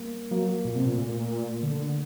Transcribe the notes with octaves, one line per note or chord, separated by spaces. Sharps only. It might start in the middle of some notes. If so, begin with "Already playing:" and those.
Already playing: G3 A#3
F#3 A#3
A#2
C3
A#2
A#2 A3
D3